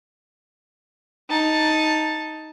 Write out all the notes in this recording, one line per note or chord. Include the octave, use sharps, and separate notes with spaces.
D#4 A5